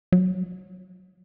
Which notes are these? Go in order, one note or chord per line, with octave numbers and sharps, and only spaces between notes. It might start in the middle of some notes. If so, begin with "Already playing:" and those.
F#3